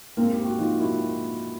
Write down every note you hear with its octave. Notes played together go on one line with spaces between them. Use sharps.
G#2 A#3 C4
G4
F#4
F3 D#4 F4
E4 F#4